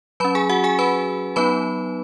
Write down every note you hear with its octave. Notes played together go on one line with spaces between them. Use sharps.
F#3 C#4 B4 B5
G#4 G#5
F#4 F#5
G#4 G#5
B4 B5
F#3 B3 D#4 B4 B5